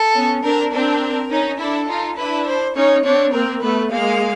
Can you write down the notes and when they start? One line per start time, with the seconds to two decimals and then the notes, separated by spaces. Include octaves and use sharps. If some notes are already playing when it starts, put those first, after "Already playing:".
Already playing: A4
0.15 B3 C#4
0.44 C4 D4 A#4
0.73 C4 D4 A#4
1.30 C#4 D#4
1.59 D4 E4 A4
1.89 D#4 F4
2.18 D4 E4 B4
2.47 C5
2.76 C#4 D#4 C#5
3.05 C4 D4 C#5
3.34 A#3 C4 A#4
3.62 A3 B3 B4
3.91 G#3 A#3 F5